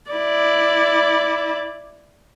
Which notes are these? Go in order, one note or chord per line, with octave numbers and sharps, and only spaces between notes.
E4 D5